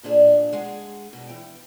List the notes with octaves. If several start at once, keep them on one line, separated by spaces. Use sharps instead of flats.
D2 A#2 D4 G#4
G#3 G#4 F#5
F#2 B2
E3 G5